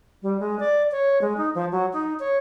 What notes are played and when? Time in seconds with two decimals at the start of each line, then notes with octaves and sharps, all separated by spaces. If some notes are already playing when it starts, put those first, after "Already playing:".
0.22 G3
0.40 G#3
0.59 D5
0.91 C#5
1.21 G#3
1.37 D#4
1.55 F3
1.72 F#3
1.93 D#4
2.19 C#5